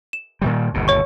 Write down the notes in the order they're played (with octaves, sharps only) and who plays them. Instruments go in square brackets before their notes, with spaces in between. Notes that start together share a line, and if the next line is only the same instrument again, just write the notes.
[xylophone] E7
[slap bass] A#2 D#3 G3
G1 D#2 B2
[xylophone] C#5 C#6